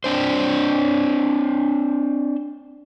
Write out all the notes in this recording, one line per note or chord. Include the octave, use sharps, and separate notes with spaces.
C4 D4 C5